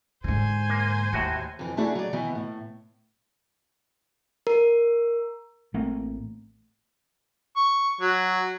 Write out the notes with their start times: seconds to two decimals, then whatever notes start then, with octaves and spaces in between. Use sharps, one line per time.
0.24 G#2 D3 C5 G#5
0.69 A#3
1.13 D#2 A2 F#4
1.59 F2 E3
1.77 A3 D4 E4 F#4 G#4
1.95 F#3 D5
2.13 D#3 E3 B3
2.35 A2
4.47 A#4
5.74 A1 A3 A#3 C4
7.56 C#6
8.01 F#3